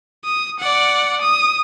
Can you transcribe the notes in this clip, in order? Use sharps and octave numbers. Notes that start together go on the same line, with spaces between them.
D#6
D5 F#5
D#6